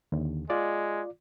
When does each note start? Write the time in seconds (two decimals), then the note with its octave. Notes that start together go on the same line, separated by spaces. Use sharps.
0.12 D#2 D3
0.50 G#3 F4 D5